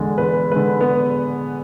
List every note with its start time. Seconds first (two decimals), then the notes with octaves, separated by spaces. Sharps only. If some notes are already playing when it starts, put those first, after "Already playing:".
Already playing: E2 D3 G#3 A4
0.18 E2 B4
0.51 D3 G#3 B4
0.81 B3